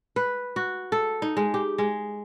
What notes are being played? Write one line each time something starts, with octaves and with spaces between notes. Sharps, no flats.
B4
F#4
A4
D#4
G#3
G4
G#3